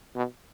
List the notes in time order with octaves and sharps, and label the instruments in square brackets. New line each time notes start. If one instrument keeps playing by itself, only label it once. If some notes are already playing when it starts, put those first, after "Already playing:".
[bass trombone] B2